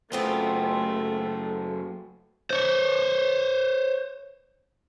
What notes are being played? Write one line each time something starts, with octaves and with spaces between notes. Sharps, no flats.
F#2 C#3 A3 B3 C4 F4 A4
C5 C#5